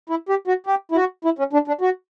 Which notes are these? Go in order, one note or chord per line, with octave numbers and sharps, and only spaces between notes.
E4
G4
F#4
G4
E4
F#4
E4
C#4
D4
D4
F#4